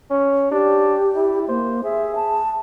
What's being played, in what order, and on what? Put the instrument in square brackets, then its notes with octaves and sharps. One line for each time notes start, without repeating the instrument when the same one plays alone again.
[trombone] C#4
[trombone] D4 [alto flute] G4
[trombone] E4
[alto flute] A#3 [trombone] C5
[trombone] G#4 [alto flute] E5
[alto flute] A5